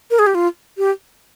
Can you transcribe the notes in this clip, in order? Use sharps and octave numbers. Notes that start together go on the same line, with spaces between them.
A#4
G#4
G4
F4
G4